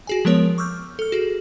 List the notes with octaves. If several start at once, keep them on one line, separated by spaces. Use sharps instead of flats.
F#4 G#4 G#5
F3 G#3 B3 A#4 C#5
C#6 D6 E6 F6 G6
A4 F6
F#4 G#4